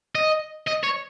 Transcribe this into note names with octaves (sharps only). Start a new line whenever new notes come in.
D#5
D#5
C#5